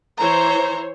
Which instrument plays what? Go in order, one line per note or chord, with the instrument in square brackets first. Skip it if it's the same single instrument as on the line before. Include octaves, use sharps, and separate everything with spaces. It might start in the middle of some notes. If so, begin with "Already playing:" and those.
[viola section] E3 C5 C#5 [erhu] A#5